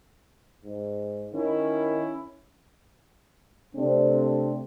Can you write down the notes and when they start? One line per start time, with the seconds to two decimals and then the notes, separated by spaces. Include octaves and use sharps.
0.64 G#2
1.33 D#3 C#4 E4
3.76 C3 A3 C4 D4